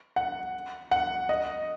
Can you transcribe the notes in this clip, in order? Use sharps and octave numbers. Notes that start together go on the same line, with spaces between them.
F#5
F#5
D#5